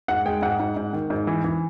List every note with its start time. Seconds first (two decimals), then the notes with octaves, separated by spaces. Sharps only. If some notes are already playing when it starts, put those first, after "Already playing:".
0.08 G#2 F#5
0.26 G#3 G5
0.42 G#2 F#5
0.60 G#2
0.77 G#2
0.93 D#3
1.10 G#2
1.27 E3
1.44 E3